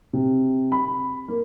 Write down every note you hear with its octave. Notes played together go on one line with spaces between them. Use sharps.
C3
B5
A#3